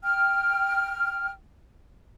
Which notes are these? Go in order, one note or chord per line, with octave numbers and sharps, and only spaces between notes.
G5 F6